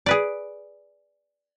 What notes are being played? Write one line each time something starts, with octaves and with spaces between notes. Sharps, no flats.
G#4 B4 D5